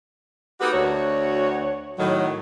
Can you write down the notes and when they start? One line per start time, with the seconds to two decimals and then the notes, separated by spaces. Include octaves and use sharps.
0.61 A#3 D#4 F#4 G4 A4 B4
0.73 D2 F#4 C#5
1.99 A2 D#3 F#3